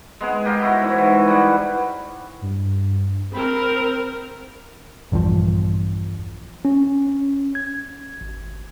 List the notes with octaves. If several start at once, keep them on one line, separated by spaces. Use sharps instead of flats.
G#3 B3 G#4
G4 A#4 D#5 F5
E4 F#4 A#4 C#5
G#2 E3
E3
G3 G#4 F#5
G2
C4 A#4 B5
A#1 E2 G2 F3
C#4
G#6
G#1